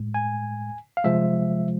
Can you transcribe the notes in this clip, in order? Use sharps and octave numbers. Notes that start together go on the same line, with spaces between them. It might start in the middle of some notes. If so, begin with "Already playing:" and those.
Already playing: A2 G#3
G#5
F5
C3 F3 G#3 E5